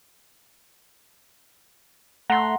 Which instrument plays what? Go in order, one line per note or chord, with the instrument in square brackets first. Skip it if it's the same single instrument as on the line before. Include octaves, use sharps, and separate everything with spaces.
[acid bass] A3 [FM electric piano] F#5 [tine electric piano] A#5 C6